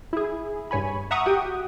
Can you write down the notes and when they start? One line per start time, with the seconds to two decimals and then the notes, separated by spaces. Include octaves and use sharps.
0.13 E4 G#4
0.71 G2 C#5 G#5 B5
1.11 E5 F#5 A#5 C#6 D#6
1.26 F#4 G4 G5 D#6